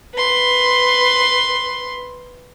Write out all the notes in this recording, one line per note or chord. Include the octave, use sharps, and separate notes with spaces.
B4 C6